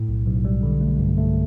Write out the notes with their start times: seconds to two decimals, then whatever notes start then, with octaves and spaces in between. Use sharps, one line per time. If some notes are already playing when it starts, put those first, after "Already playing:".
Already playing: A2
0.08 B1
0.26 B1
0.45 G3
0.63 D3
0.81 A3
0.99 G2
1.18 A3